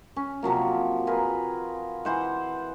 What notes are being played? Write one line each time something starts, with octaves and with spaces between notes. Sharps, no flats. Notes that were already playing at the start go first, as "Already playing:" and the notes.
C#4
C3 F3 F#3 A#3
F4 G#4 A#4 B4
E3 C5 F#5